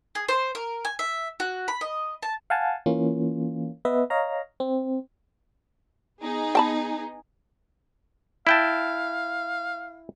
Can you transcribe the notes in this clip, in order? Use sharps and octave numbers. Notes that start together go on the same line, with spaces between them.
G#4
C5
A#4
G#5
E5
F#4
B5
D#5
A5
F5 F#5 G#5 A5
E3 A#3 C#4 F4
B3 B4 D#5 E5
C#5 D#5 F5 A#5
C4
B3 D#4 G#4
G5 A5 B5
E4 F5 G5 A5